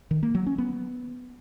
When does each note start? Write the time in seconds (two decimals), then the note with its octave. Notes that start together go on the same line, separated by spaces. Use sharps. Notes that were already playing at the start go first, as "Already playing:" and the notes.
0.11 D#3
0.23 A#3
0.35 F#3
0.46 C#4
0.58 B3